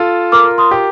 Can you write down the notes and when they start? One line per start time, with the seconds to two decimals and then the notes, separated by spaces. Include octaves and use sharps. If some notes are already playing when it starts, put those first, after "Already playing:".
Already playing: F4 A4
0.32 A#4 D6 F6
0.58 C6 D#6
0.71 G4